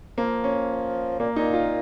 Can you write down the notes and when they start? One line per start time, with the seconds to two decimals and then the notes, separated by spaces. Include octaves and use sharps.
0.18 F3 A#3
0.44 C#4
1.20 A#2 A#3
1.36 A#2 D#4
1.53 F4